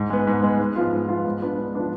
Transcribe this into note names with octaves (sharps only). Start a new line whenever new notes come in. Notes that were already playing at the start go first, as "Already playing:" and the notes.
Already playing: G#2
G#3 B3
G#2
G#3 B3
G#2
F3 B3 F4
G#2
F3 B3 F4
G#2
F3 B3 D4
G#2
F3 B3 D4